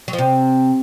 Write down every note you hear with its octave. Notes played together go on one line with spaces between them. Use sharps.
F#3
F3
C3